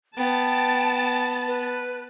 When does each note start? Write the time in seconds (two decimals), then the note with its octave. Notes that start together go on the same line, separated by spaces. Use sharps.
0.18 B3 G5 A5
1.47 B4